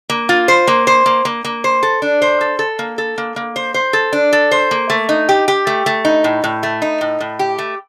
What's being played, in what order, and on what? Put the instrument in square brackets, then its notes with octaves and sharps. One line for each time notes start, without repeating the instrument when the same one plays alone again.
[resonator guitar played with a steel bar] A#3
F4
C5
A#3
C5
A#3
A#3
A#3
C5
A4
D4
C5
A4
A4
A#3
A4
A#3
A#3
C5
C5
A4
D4
A4
C5
A#3
A3
D#4
G4
G4
A3
A3
D#4
A2
A2
A3
D#4
A2
A2
G4
A3